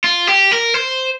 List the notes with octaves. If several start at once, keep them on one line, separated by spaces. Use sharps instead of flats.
F4
G4
A#4
C5